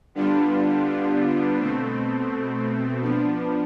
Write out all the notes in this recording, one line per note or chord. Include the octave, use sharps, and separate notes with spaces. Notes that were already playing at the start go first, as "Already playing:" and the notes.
D3 G3 B3 D4 F4
B2 A3 C4
F3 B3 D4